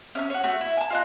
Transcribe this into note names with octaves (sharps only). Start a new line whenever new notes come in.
C#4 E5 F6
F#4 C#5
A3 F#4
E4
G#5 A5
F4 D#5 F#6